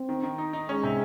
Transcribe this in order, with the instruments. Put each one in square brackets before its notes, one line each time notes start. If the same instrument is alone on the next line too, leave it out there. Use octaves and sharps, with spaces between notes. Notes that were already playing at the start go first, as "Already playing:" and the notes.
Already playing: [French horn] C4
[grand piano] D#3
D#3
D#4
D#4
[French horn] G#3 [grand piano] C#4
[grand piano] C3